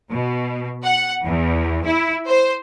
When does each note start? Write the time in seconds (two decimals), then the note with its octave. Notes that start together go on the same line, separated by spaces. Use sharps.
0.11 B2
0.85 F#5
1.24 E2
1.85 E4
2.28 C5